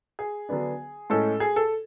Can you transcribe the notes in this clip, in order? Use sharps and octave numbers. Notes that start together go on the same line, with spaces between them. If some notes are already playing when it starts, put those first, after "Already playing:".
G#4
D3 F#3 B3 D4
A2 G#3 C#4 A4
G#4
A4